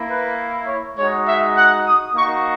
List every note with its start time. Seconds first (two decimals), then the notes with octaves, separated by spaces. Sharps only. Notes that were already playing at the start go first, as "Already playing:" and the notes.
Already playing: A#3 E4
0.08 B4
0.67 C#5
0.97 G#3 D#4 F#4 C#5
1.26 E5
1.55 F#5
1.86 D#6
2.15 A#3 D#4 F#4 C#6